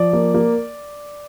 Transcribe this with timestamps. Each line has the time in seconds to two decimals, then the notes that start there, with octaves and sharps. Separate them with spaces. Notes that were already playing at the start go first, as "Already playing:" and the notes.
Already playing: F3 D5
0.13 A#3
0.34 A#3